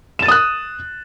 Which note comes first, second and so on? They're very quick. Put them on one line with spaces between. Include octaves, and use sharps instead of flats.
E7 A6 D#7 D#6 F#6